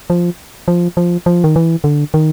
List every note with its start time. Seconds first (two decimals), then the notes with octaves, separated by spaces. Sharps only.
0.10 F3
0.68 F3
0.97 F3
1.26 F3
1.44 D#3
1.56 E3
1.84 D3
2.14 D#3